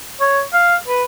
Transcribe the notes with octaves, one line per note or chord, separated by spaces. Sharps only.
C#5
F5
B4